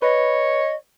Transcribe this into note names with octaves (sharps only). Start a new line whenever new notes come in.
B4 C#5 D#5